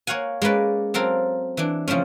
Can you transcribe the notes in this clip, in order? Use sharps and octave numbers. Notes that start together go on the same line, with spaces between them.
A#3 C#5 F5 F#5 G#5
G#3 A#3 C#4 B4 D5
F#3 C4 A4 A#4 F5
E3 D4
C#3 F3 A3 C4 C#4